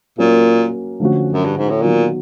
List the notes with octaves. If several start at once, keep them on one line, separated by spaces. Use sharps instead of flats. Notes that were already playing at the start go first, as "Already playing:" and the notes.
A#2 F#3 A#3 C#4
D3 F3 A3 C#4 F#4
F#2
G2
G#2
A2
A#2 D#3 F#3 B3